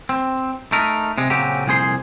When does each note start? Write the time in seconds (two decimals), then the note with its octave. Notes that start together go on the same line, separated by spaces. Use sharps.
0.09 C4
0.72 A3 D#4 A#4
1.18 C3 G#3
1.30 A#2 C#3 F#3 C4 G4
1.66 C2 F2 A#2 G#4 C5 C6